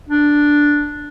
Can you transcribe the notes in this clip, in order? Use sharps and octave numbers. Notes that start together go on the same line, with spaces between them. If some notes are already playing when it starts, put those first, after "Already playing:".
D4